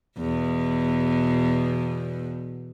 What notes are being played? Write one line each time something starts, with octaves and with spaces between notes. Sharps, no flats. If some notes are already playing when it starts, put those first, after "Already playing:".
E2 B2